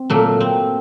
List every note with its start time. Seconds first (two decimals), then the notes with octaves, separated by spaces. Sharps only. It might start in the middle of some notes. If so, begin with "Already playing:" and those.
Already playing: C4
0.10 A#2 F#3 A3 A#3
0.40 C4